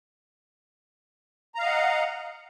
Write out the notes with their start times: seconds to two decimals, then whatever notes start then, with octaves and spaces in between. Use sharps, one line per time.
1.55 A#5
1.59 F5
1.62 D#5
1.66 F#5